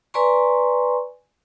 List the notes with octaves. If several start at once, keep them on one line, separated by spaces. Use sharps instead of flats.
B4 D5 G#5 A#5 C6 C#6